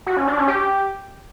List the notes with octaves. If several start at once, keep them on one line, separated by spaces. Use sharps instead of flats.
F#4
C#4
D4
C#4
G4